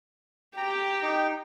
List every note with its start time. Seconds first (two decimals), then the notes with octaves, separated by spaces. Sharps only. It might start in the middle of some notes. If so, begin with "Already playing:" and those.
0.57 G4 G5 A#5
1.02 D#4 G5